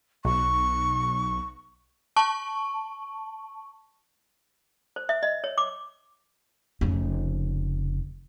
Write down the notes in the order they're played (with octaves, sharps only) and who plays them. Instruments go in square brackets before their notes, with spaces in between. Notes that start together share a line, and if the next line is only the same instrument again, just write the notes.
[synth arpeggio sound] B1 [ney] C#6
[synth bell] A5 C#6
[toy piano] C5
E5
D#5
C#5
D6
[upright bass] F1 C#3